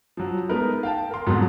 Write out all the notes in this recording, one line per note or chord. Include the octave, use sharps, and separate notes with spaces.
F3 F#3
G#3 A3 B3 D#4 A#4 B4
F5 G5 A5
A#4 C6
F2 G#2 B2 D3 F#3